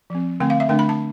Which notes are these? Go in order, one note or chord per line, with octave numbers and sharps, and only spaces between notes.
F3 C4
D3 A3 C4 G5
F5
E5
D3 A3 D4 G5
B5
A5